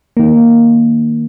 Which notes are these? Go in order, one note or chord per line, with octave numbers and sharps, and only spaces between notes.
D#3 A#3